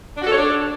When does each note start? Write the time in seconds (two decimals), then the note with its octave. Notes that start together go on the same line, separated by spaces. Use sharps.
0.17 D4
0.22 F#4
0.27 A4
0.32 C#5
0.37 D4